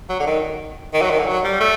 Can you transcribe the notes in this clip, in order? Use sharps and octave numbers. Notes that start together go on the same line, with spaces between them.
F#3
D3
D#3
D#3
F#3
D#3
D3
F#3
G3
A3